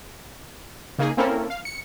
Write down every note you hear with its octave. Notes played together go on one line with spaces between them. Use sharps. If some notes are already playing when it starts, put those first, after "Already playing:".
C#3 A#3 D#4 G#4
A#3 C4 C#4 E4 A4 A#4
F5
C#7